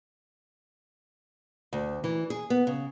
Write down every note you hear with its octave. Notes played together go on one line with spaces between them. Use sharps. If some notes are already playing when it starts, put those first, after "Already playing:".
D2
E3
G#4
B3
C#3